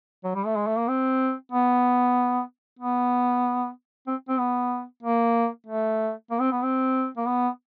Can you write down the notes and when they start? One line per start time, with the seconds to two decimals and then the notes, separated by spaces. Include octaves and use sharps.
0.24 F#3
0.35 G3
0.46 A3
0.56 G#3
0.67 A3
0.78 A#3
0.88 C4
1.52 B3
2.79 B3
4.07 C4
4.29 C4
4.39 B3
5.03 A#3
5.67 A3
6.31 A#3
6.40 C4
6.52 B3
6.62 C4
7.17 A#3
7.26 B3